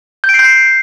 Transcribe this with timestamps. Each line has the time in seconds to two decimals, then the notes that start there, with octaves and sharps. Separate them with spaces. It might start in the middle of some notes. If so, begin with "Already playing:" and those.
0.24 G6
0.29 D7
0.34 C7
0.39 G6
0.44 C7